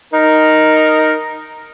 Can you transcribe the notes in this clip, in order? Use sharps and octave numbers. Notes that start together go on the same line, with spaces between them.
D#4 A#4